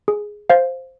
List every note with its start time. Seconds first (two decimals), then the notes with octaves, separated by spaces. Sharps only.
0.08 G#4
0.50 C5 F5